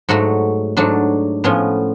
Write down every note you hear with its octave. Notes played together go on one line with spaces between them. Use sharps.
G#2 F#3 A3 F#4
G#2 F#3 A3 D4
A2 F3 B3 C#4